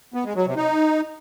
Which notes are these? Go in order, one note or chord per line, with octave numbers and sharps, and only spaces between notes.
B3
G#3
F#3
C3
D#4